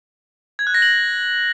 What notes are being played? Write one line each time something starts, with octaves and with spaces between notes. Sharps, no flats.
G#6
F#6
A#6
F#7